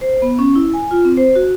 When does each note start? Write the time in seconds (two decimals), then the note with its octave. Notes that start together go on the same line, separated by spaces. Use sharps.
0.01 C5
0.22 B3
0.39 C#4
0.55 E4
0.74 G#5
0.91 F4
1.05 C4
1.17 C5
1.35 F#4